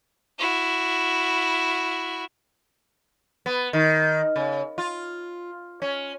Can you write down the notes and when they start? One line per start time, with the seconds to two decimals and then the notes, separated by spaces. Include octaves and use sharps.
0.39 E4 F#4
3.46 B3
3.73 D#3
4.36 C#3
4.78 F4
5.82 C#4